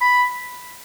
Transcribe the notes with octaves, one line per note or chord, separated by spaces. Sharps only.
B5